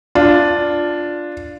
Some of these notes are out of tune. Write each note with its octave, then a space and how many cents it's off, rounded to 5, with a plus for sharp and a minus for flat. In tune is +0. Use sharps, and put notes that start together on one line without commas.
D4 +0 F4 +0